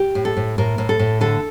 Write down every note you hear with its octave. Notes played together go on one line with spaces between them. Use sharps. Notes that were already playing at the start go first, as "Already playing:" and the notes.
Already playing: G4
A2
A4
A2
A2 A#4
A2
A4
A2
D3 A4